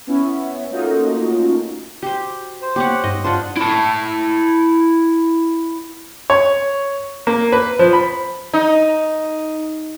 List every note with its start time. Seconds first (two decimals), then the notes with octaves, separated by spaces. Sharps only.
0.07 B3 C#4 E4
0.70 A3 A#3 C#4 D#4 F4 F#4
2.02 F#4 G4 C5
2.62 C5
2.76 A#3 B3 G4 C#5 F#5
3.04 G2 D#4 D#5
3.24 D4 F4 C5 F#5
3.57 E4 A5
6.30 C#5
7.27 A#3
7.52 B4
7.79 F3
7.93 B5
8.54 D#4